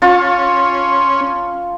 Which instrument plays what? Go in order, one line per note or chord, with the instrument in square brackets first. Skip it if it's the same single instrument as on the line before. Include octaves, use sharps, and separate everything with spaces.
[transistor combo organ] C#4 [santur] F4 A5